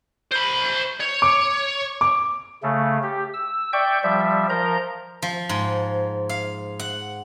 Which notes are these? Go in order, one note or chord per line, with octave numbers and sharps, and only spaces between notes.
C5 B5
C#5
D6
D6
C#3 A3
G4
E6
D5 E5 G5 C#6 G6
F3 G3 E5
F3 A#4 A#5 G6
F3
G#2
F5
F#5